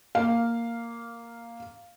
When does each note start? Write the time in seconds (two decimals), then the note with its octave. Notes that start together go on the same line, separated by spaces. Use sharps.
0.15 A#3 F5